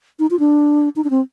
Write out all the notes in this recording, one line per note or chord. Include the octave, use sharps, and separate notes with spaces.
D#4
F4
D4
D#4
D4
C4